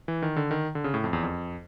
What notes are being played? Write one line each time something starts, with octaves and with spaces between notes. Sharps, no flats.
E3
D#3
D3
D#3
D3
C#3
A2
F2
E2
F2